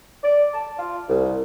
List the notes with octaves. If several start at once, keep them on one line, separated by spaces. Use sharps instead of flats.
D5
A5
F4
C2